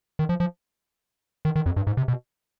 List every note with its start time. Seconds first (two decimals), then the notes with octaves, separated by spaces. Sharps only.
0.19 D#3
0.29 F3
0.40 F3
1.45 D#3
1.56 D#3
1.66 F2
1.76 G2
1.87 G#2
1.97 C3
2.08 B2